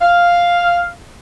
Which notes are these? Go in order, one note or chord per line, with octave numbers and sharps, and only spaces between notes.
F5